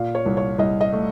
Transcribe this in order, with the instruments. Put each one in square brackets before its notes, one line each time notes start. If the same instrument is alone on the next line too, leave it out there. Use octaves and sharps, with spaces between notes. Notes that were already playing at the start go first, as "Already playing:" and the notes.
Already playing: [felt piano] A#2 F5
C#5
C2
C#5
C2 D#5
D#5
A3